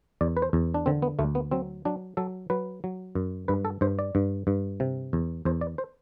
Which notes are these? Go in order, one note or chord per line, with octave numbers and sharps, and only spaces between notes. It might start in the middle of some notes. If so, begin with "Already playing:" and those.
E2 D5
B4
C5
E2
D4
D3 C4
B3
D2 A3
B3
F#3 C4
F#3 D4
F#3 A4
F#3 B4
F#3
F#2
G2 B4
A4
G2 C5
D5
G2
G2
C3
E2
E2 C5
D5
C5